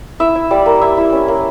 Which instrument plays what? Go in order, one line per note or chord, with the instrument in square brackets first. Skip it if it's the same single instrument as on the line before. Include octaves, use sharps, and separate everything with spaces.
[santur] E4 E5
E4
G3 D5
A#3
E4 E5
E4
C#4
A#3